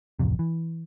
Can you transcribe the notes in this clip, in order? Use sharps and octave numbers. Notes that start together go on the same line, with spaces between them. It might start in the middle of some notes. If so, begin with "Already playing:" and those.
D1 A1 F2 C3
E3